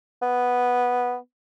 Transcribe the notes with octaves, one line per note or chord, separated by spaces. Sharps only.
B3